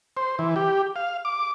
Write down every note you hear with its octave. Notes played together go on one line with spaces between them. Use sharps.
C5
E3
G4
F5
D6